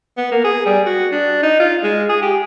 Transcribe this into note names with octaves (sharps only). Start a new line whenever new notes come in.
B3
A#3
G#4
G3
F#4
D4
D#4
F4
G#3
G#4
G4